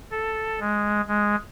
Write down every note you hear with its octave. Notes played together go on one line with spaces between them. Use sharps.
A4
G#3
G#3